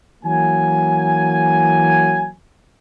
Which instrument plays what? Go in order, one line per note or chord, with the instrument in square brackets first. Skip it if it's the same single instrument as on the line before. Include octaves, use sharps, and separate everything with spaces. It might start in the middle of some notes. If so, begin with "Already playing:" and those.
[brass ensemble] E3 F#3 A#3 G#5